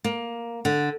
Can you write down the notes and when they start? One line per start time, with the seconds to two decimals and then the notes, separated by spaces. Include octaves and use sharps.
0.04 A#3
0.65 D3